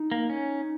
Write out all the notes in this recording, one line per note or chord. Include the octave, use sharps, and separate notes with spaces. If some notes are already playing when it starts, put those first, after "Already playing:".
Already playing: D#4
A#3
C#4